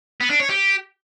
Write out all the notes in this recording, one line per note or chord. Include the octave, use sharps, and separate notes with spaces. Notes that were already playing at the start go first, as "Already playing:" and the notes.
B3
D4
C#5
G4